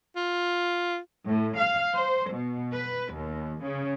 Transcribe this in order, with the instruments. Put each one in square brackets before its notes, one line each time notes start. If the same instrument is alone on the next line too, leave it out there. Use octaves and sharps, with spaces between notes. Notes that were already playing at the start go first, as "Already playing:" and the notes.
[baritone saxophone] F4
[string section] A2
F5
C5
B2
B4
D#2
C#3